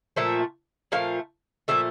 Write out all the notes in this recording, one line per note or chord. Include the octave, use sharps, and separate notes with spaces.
A#2 F3 A3 E5
A#2 F3 A3 F5
A#2 F3 A3 E5